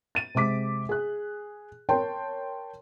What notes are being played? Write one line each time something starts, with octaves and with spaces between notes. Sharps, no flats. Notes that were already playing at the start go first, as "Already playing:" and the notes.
A6 D#7
C3 G#3 D6 B6
G#4 F#6
A#4 C#5 G5 A5 C6